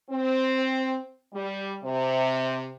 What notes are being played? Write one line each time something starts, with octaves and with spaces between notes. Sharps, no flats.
C4
G3
C3